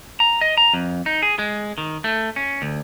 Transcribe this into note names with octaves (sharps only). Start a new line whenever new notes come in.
A#5
D#5
A#5
F2
D#4
G#4
G#3
D#3
A3
C#4
D2